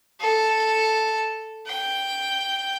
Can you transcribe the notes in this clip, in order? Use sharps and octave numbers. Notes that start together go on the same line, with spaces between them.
A4
G5